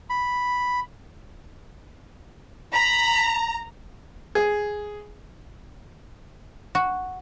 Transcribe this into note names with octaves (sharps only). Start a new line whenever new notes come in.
B5
A#5 B5
G#4
F#4